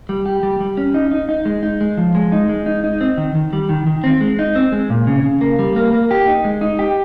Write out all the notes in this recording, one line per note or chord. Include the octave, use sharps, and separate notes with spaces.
G3
G4
G3
G3
C#4
D#4
D#4
D#4
G#3
D#4
G#3
F3
G#3
D#4
G#3
D#4
D#4
C4
D#3
D#3
G3
D#3
D#3
C4
G#3
D#4
C4
G#3
A#2
C#3
C#3
A#3
G3
A#3
A#3
G4
D#4
G#3
D#4
G4